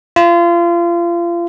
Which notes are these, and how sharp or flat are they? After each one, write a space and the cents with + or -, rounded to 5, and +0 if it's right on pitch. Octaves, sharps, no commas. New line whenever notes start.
F4 -30